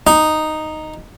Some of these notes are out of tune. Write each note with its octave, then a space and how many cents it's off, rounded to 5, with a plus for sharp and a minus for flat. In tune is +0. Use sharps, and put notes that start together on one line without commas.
D#4 -5